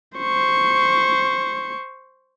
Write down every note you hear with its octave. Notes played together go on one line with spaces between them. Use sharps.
C5 C#6